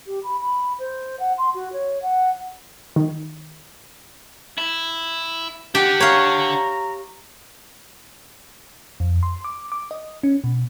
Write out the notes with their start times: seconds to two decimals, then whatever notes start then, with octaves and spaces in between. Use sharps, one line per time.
0.07 G4
0.24 B5
0.40 B5
0.79 C5
1.20 F#5
1.38 C6
1.55 F#4
1.73 C#5
2.02 F#5
2.96 D#3
4.58 E4
5.75 D4 G4 F#5
6.00 C#5 F5 A#5
9.00 F2
9.23 C6
9.44 D6
9.72 D6
9.91 D#5
10.23 C#4
10.44 B2